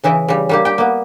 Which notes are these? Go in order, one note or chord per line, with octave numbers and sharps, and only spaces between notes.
C#3 E3 E4 D#5
C#3 G3
G3 A#3 G4
G4 G5
A#3 B3